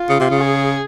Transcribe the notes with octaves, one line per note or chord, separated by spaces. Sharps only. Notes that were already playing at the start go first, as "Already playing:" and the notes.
Already playing: F4
C#3
C3
C#3
G#4